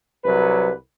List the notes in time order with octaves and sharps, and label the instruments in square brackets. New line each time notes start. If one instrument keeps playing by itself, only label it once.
[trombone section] C2 F#3 B4